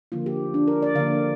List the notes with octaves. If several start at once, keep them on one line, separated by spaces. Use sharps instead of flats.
D3 F3 A#3 F4
G4
D4
A#4
D5
D3 F3 A#3 F5